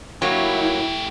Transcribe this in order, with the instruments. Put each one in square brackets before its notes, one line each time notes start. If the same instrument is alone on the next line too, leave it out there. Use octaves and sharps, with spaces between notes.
[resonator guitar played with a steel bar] F#3 A#3 [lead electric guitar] A3 G4 [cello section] E4